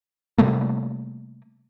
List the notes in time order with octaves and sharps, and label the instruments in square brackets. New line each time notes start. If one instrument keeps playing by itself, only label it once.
[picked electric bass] C3 G3 A3 A#3